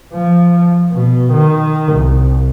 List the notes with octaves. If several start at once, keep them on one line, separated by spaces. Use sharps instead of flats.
F3
B2
D#3
C2